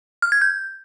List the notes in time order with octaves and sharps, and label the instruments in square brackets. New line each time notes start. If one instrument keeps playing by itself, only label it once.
[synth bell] F6
G#6
G6